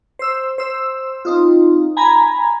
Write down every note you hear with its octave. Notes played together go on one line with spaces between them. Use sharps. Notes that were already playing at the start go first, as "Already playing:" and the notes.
C5 E6
C5 E6
C4 D#4 F4
G#5 A#5 B5 G#6